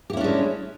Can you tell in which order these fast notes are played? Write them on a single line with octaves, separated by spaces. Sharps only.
G4 E4 C#4 D4 G#3